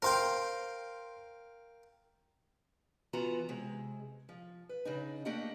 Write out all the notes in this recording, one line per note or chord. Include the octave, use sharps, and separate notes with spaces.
A#4 C5 F5 G5 C6
E3 B3 F4 F#4 A#5
C3 G#3
F3
B4
C#3 D4 D#4
A3 A#3 D4 G4 D#5 F#5